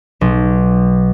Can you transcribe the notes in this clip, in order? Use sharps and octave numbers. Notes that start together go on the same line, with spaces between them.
B1